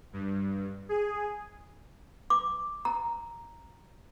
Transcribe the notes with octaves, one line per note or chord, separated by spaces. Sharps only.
G2
G#4
D6
A#5